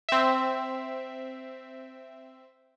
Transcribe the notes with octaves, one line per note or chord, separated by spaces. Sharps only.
C4 E5